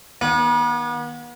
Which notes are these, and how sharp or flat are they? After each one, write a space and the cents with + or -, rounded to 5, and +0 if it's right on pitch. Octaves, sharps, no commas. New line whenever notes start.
D#3 +0 B3 -45